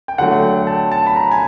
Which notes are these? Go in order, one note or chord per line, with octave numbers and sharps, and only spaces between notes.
G5
D3 F#3 A3 F#5
G5
A5
A5
B5
A#5
G#5